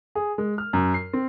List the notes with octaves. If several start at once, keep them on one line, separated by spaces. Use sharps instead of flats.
G#4
G#3
F6
F#2
C7
C4